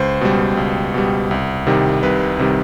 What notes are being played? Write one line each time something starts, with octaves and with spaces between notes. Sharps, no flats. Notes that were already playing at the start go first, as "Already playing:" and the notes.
Already playing: C#2 C5
B2 G3
C#2
B2 G3
C2
C3 D#3 G3
C2 B4
C3 D#3 G3